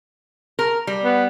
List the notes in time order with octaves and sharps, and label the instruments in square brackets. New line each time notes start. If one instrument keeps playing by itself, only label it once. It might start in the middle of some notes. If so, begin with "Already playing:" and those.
[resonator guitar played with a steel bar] A#4
G3
[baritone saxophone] B3